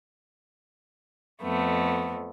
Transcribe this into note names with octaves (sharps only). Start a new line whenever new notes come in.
F2 A3 B3